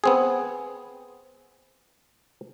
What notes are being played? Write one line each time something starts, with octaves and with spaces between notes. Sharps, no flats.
B3 C4 G#4